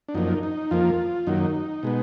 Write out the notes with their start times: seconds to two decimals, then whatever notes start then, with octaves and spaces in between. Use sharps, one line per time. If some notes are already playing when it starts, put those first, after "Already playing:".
0.08 D4
0.14 F#2 F3 A#3 D#4
0.43 D#4
0.71 F2 F3 A#3 F4
1.27 F#2 D#3 F#3 A#3 D#4
1.83 B2 G#3 B3